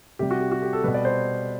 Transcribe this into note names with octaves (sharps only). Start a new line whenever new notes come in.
C3 G3 G4
F#4
G4
F#4
G4
A4
B2 G3 B4
D5
C5